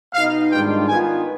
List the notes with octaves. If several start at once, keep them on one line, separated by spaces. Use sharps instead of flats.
B2 B3 D#4 F5
G#2 D#3 G3 D4 F4 G5
D#3 B3 F4 G#5